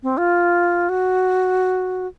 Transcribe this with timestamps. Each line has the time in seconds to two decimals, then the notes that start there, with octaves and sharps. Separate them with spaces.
0.03 C4
0.18 F4
0.89 F#4